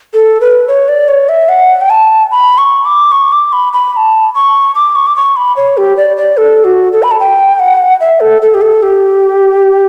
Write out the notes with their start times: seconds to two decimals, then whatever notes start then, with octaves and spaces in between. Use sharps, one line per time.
0.14 A4
0.41 B4
0.68 C#5
0.88 D5
1.08 C#5
1.29 E5
1.49 F#5
1.81 G5
1.90 A5
2.31 B5
2.58 C#6
2.85 D6
3.12 C#6
3.33 D6
3.53 B5
3.73 B5
3.93 B5
3.97 A5
4.35 C#6
4.75 D6
4.95 C#6
5.07 D6
5.16 C#6
5.36 B5
5.57 C#5
5.77 G4
5.97 D5
6.17 D5
6.37 A4
6.64 F#4
6.93 A4
7.03 B5
7.11 A5
7.20 G5
7.60 F#5
8.00 E5
8.20 A4
8.42 A4
8.54 G4
8.61 A4
8.83 G4